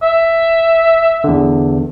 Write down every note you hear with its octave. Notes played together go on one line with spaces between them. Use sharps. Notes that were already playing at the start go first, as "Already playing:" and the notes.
E5
E2 D3